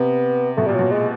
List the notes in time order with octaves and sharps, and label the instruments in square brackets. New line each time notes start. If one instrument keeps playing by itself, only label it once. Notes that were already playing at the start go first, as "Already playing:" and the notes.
Already playing: [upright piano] C3 [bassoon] B3
[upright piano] B2 [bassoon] A3
[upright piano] A#2 [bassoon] G3
[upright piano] B2 [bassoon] F#3
[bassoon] G#3